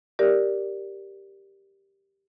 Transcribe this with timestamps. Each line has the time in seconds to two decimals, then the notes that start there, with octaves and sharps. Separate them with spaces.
0.19 G4 A#4 D5